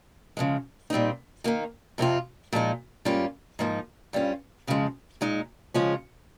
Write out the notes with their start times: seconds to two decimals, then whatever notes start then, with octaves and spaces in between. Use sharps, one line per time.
0.37 C#3 F3 G#3
0.90 A#2 G3 C4 D#4
1.44 D#3 A#3 D#4
1.98 F2 C3 F3 C4 F4
2.53 A#2 F3 G#3 D#4
3.05 G#2 G3 A#3 C#4 F4
3.59 G#2 F3 A#3 D#4
4.13 G2 G3 C#4 F4
4.67 F2 C#3 F3 G#3
5.21 A#2 G#3 D#4
5.74 C#3 F3 G#3 C#4 F4